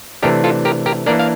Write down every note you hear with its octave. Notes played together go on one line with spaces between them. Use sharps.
C3 E3 A3 D4 G4 A#4
F4 A4
G4 A#4
G4 A#4
E3 A#3 D4 A#4 D5
F5